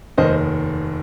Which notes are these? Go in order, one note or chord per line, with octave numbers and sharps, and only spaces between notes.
F1 D#2 D#3 C5 D#5